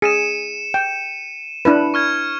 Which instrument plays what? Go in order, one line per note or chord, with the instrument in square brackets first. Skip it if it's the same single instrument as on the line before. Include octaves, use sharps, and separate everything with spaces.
[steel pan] G#4 [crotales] C#7 D#7 E7
[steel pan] G5
D4 E4 B4
[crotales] C#6 F6 G#6